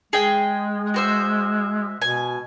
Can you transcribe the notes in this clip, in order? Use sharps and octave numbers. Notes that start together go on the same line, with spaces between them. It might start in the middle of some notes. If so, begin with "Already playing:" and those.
G#3 G#4 D#5 G5
F#4 C5 E5
B2 G#5